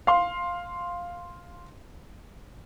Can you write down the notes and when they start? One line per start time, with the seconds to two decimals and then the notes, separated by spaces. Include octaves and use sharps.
0.07 F5 C6